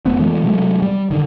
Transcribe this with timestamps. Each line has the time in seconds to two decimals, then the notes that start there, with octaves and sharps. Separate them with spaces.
0.05 F1 A3 B3 C4
0.19 E3 F3 G#3 A3
0.44 C3 F#3 G#3 A3
0.82 G3
1.10 D3 D#3